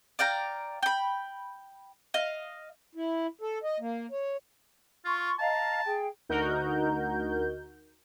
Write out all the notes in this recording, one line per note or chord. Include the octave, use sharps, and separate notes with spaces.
D5 F5 G5 A#5
G5 B5
D#5 F5
E4
A4
D#5
A#3
C#5
F4 C6 C#6
D#5 F5 A5 A#5
G#4 G5
D2 D#4 F#4 A#4 G6